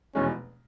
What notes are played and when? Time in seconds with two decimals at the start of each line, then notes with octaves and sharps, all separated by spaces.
0.15 F1 E2 B2 G#3 C#4